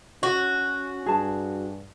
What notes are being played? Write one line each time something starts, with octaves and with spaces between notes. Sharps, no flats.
C#4 F#4
G2 G#4 A5